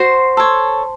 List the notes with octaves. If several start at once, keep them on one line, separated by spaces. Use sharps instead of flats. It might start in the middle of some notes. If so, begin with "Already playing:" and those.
Already playing: F#4 C5 C6
A4 C#5